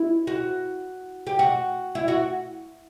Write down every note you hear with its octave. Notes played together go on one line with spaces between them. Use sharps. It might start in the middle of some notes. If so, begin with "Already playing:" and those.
Already playing: E4
F#4
G4
F#4
E4
F#4